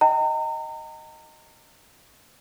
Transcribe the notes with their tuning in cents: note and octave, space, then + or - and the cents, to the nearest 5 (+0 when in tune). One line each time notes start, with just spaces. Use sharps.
D#5 +0 G5 -25 A#5 -35